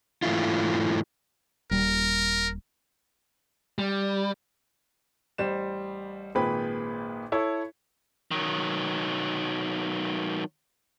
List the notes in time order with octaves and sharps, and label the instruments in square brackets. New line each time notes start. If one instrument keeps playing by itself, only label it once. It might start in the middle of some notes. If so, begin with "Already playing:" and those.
[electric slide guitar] G#2 E3 A3 E4 F4
[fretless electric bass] D#1 G3 [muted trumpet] A#4
[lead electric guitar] G3
[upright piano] A1 G3 C5 E7
G#1 A#2 G#4 B4 G5 B5
E4 A4 C#5
[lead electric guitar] D#3 F#3